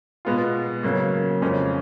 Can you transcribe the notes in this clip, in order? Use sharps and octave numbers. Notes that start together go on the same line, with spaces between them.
B2 G#3 B3 F4
C#3 F#3 A#3
F2 C#3 F3 G#3 C#4